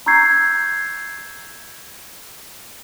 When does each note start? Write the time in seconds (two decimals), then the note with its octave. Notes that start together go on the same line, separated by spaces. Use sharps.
0.06 A#5 C#6 E6 G6 G#6 C7